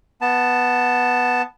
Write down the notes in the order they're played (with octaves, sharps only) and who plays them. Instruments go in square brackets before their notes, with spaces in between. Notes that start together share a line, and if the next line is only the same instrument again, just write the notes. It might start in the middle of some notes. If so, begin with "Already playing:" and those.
[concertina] B3 A5